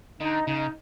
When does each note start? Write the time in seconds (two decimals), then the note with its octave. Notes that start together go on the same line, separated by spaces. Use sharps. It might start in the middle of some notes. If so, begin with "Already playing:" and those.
0.20 D3 D#4
0.47 C#3 D#4